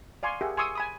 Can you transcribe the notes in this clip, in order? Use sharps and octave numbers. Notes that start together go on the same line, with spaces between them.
D5 F5 G#5 C6 C#6
G4 G#4 A#4 E5 F#5
G#5 C6 C#6 D#6 E6
G#5 B5 D#6